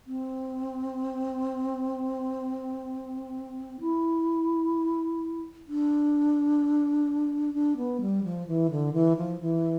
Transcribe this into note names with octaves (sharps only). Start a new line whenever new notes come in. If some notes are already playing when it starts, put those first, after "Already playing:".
C4
E4
D4
D4
B3
G3
F3
E3
D3
E3
F3
E3